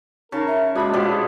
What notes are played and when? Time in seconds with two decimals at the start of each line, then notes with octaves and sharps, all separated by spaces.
0.32 C#3 D#4 A#4 A5 C#6
0.47 E5
0.75 A#2 G#3 D4 F#4 G#4 B5
0.93 B2 E3 F3 G4 D5
1.09 G#4